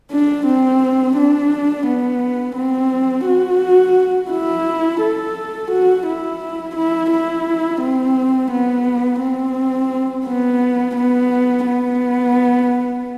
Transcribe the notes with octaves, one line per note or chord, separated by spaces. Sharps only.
D4
C4
D4
B3
C4
F#4
E4
A4
F#4
E4
E4
E4
C4
B3
C4
B3
B3
B3